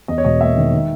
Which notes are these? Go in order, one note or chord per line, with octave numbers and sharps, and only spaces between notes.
E2 D#5
C#5
E1 D#5
A#3 E5
D#3
D#3